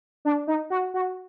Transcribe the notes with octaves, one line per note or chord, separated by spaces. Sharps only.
D4
D#4
F#4
F#4